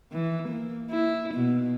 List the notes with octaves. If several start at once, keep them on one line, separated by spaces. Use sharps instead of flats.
E3
A#3
E4
B2